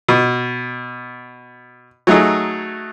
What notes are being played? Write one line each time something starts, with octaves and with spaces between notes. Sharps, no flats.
B2
F#3 A3 D#4 G#4